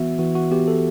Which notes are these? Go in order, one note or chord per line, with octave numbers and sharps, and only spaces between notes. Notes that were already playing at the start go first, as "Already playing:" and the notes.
Already playing: E3 B3 F#4 E5
E3 F#4
F#4
B3 G4
A4